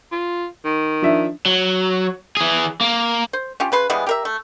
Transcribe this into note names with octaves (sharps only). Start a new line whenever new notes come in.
F4
D#3
F3 D4 E5
F#3
E3 G#4
A#3
C5
C#4 F4 G4
C#3 B4 C6
E3 G3 G#3 B3
G4 A#4 E5
A3